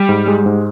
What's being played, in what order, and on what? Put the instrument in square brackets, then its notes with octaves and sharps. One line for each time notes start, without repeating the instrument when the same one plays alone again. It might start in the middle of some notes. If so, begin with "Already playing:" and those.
Already playing: [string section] G3
[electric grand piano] G#2
G#3
G#2